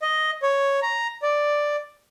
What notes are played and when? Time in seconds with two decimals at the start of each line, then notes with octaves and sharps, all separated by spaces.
0.02 D#5
0.42 C#5
0.82 A#5
1.22 D5